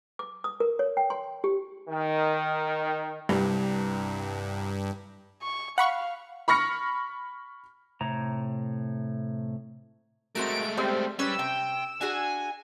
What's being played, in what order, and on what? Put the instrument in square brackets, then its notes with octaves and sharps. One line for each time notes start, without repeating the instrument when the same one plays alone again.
[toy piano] D6
D#6
A#4
C#5
G5
C6
G4
[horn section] D#3
[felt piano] C2 [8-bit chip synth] G2
[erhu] C#6
[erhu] F5 [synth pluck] F#5 B5 C#6
[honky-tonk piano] B5 C#6 F6 A#6 C#7
[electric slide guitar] A2 C3 A#5
[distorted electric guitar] G#3 A3 [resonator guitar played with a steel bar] C4 F#4 A#4 [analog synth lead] D7
[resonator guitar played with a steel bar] G3 [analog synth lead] C4
[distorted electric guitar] G3 G4 [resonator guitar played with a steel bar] C#4 B4 [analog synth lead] E6
[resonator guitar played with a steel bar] C3 [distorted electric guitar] G5
[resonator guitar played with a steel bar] D4 F#4 G#4 [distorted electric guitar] G#5